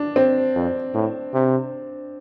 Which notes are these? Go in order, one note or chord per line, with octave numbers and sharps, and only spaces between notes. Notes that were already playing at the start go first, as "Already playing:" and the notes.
Already playing: D4
C4
F2
A2
C3